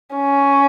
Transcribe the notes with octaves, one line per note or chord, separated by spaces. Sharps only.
C#4